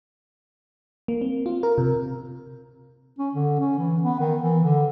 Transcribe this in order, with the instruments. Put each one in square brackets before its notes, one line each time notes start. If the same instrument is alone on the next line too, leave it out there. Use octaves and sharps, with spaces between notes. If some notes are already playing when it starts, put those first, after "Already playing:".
[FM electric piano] A#3
C4
F4
A#4
C3
[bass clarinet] C#4
D3
C#4
E3
B3
D#3
E3
D3